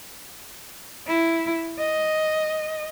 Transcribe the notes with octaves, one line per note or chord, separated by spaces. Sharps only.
E4
D#5